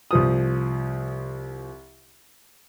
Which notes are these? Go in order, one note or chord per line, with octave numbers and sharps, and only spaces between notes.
C2 F3 D#6